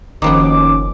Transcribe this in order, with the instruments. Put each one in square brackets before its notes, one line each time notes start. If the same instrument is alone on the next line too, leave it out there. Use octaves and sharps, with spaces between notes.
[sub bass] F#1 [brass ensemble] D#2 B2 C#4 [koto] D#3 F3 B3 [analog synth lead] D6